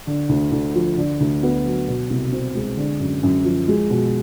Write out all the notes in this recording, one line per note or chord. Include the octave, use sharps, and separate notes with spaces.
D3
D2
D2
F3
D3
D2
B3
F#3
B2
C2
C4
G#3
D3
F#2
F#2
F3
G#3
B2